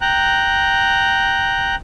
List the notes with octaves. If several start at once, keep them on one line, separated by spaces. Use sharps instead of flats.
G5 A#5 F#6